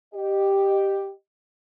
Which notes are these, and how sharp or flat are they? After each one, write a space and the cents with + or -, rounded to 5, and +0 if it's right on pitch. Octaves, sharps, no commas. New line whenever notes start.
G4 +0 D#5 -25